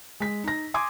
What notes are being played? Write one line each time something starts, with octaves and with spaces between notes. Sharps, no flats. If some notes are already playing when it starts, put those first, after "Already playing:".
G#3 B6
D#4 A#6
G#5 C6 D6 D#6 G#6